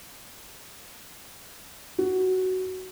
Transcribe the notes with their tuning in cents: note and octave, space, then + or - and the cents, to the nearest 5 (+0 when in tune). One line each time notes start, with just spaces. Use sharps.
F#4 +10